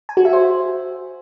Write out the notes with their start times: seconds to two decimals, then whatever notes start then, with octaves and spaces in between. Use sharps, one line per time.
0.09 G#5
0.17 F#4
0.25 E5
0.33 C5